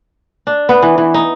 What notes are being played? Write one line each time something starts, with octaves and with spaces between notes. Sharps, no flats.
D4
B3
E3
E3
D#4